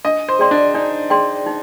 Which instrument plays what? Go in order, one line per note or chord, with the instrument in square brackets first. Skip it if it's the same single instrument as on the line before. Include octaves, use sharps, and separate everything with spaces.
[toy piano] D4 [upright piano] D#5
[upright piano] C5
[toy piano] G#4 D5 G5 C6
[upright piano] D4
[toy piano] D4 [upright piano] D#4
[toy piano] G#4 D5 G5 C6
D#4